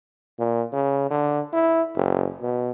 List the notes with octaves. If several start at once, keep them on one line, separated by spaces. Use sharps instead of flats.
A#2
C#3
D3
E4
F#1
B2